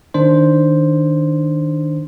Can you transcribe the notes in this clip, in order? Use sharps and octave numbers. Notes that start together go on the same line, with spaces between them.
D#3 D4 C5